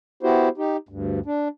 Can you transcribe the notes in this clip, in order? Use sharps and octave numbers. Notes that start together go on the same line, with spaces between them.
B3 E4 F#4 G4 C5
D#4 G4
D2 G2
D4